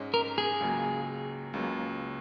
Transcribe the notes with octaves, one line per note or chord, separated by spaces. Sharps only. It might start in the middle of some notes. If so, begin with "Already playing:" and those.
Already playing: G#2 G#3 C#4
A#4
G#4
C#2 C#3 F#3 A#3
C#2 C#3 F#3 A#3